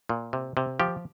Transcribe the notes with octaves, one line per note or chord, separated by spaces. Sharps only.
A#2
C3
C3
F3 G4